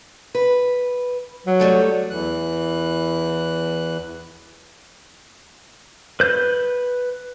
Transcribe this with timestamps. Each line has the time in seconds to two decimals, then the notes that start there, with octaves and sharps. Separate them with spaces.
0.35 B4
1.47 F#3
1.60 G3 A3 A4
2.10 E2 E3 F#6
6.20 B4 G6